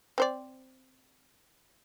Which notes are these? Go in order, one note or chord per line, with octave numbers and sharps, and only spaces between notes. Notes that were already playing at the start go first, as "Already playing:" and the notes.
C4 C5 D5